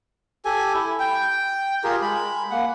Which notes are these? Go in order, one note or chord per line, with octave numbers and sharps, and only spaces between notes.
G4 A4 G#5
E4
G5
F4 G4 G#4 A#4
G#3 B5
A#3 F#5